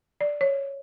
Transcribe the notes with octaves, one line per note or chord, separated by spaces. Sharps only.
D5
C#5